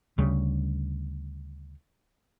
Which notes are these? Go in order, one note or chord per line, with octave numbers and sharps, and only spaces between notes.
D2 C#3 G3